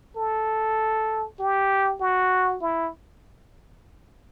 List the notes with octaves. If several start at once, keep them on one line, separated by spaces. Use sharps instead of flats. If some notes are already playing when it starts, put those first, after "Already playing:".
A4
G4
F#4
E4